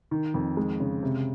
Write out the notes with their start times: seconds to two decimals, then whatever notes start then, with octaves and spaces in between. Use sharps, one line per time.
0.11 D#3
0.34 F2
0.57 G#3
0.80 C#3
1.03 C3